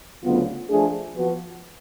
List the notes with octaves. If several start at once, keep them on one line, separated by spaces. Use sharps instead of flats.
D2 C#3 F#3 B3 F4
F3 A3 D4 G#4
F3 B3 F#4